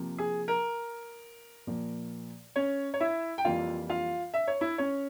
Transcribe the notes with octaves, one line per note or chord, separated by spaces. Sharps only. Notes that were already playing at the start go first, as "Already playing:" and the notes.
Already playing: C3 F3 A#3
G#4
A#4
A#2 F3 A#3
C#4 C#5
C#5
E4 E5
G5
F2 E3 G3 A#3 F4 F5
F4 F5
E5
C#5
E4 E5
C#4 C#5